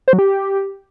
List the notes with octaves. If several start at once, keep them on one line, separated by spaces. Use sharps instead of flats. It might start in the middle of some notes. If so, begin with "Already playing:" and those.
C5
F#3
G4